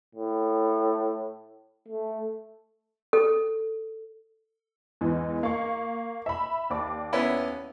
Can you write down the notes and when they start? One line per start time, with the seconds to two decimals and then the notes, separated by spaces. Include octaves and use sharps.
0.15 A2
1.88 A3
3.13 A4
5.01 E2 G#2 E3
5.43 A#3 C#6
6.26 E5 B5
6.70 D#2 D5 D6
7.13 B3 C#4 E4